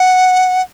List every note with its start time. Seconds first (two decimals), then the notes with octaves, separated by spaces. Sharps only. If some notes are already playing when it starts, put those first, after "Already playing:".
Already playing: F#5